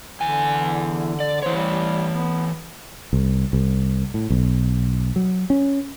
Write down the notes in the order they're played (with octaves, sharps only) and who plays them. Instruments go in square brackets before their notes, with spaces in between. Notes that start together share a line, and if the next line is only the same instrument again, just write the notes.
[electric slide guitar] E2 G#5 [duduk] D3
[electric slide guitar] D5
[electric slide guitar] E3 C#5 [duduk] C5
[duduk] G3
B3
[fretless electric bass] C2
C2
A2
B1
F#3
C#4